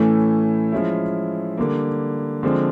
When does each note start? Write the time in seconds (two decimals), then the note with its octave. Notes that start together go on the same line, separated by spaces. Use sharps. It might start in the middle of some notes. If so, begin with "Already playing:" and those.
Already playing: A2 E3 A3 C#4
0.72 F3 G#3 C#4 E4
1.57 D3 G3 A#3
2.43 D3 F3 G#3 C4